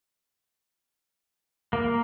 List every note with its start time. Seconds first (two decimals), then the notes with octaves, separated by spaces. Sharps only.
1.73 A#3